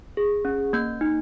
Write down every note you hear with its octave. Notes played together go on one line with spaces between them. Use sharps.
G#4
C#4
A#3 G6
D#4